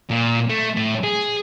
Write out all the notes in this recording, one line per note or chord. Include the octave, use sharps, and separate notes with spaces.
A#2
A3
A2
G#4